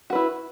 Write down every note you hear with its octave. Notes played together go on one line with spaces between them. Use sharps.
E4 F#4 B4